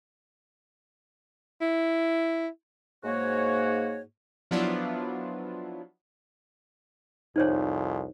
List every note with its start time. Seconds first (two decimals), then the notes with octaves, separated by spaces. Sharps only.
1.61 E4
3.04 G#2 A#3 F#4 C#5
4.51 F3 F#3 B3 D4 E4 F4
7.36 C2 F2 D#4 C5 C#5